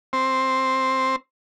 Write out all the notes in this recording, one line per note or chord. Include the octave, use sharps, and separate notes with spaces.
C4